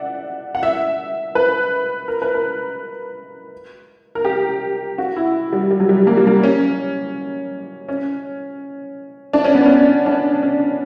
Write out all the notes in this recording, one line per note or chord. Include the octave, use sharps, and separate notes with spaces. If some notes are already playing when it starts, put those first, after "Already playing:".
Already playing: D5 E5 F#5
F#5
E5
B4
A#4
B4
A#4
A#4
G4
F#4
E4
G3
G3
F#3
G3
A#3
G3
A#3
C#4
C#4
D4
C#4
B3
C#4
D4
C#4